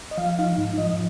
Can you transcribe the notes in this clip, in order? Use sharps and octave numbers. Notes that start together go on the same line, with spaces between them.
D#5
F3 F5
D#4 F5
G#2
F3 D#5